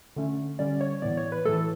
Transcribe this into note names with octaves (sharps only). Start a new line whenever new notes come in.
D3 A3 C#4
D3 G3 C#4 D5
C#5
A2 E3 B3 D5
C#5
B4
A2 E3 A3 A4